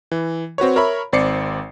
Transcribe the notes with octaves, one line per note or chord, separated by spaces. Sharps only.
E3
C4 F#4 B4 C#5
A#4 C#5 E5 B5
G#1 C4 D5 C7 C#7